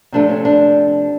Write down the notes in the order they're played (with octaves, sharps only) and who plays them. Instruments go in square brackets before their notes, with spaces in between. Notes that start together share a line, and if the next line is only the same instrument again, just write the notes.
[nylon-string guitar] C3 F3 A3 D4
C#4
D4